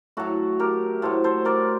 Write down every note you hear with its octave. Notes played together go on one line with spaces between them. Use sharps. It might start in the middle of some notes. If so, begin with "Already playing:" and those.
A2 F#3 F#4 A4
G4 A#4
A2 F#3 A4 C5
A4 C5
A#4 D5